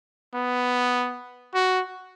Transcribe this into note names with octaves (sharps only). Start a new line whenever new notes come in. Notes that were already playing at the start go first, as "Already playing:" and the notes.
B3
F#4